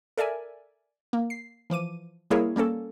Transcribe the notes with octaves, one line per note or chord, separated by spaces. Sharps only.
A4 A#4 D5 E5 G#5
A#3
C7
E3 F3 D6 D#7
G3 A#3 E4 G#4 A#4 C#5
G3 A#3 C#4 A4